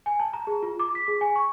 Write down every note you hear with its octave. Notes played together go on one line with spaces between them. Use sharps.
G#5
A5
A#5
G#4
F4
D6
B6
G#4
G#5
C#6